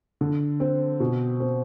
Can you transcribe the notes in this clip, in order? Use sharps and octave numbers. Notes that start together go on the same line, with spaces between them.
D3
C4
B2
C4